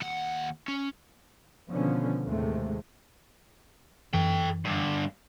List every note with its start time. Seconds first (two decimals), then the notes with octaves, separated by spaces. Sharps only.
0.02 D#2 F#5
0.68 C#4
1.69 B2 D3 D#3 F3 B3 C#4
2.24 D#2 A2 C3 G#3 A3
4.13 F#2 E3 A4 G5
4.65 G2 D3